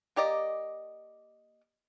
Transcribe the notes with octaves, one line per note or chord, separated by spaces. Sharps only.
A#3 G4 D5 D#5